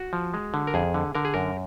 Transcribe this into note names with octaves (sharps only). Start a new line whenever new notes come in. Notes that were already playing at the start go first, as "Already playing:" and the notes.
Already playing: F#4
F3
G#3
D3
A#4
F2 G#4
D3
D3 A#4
G#4
F#2 A#4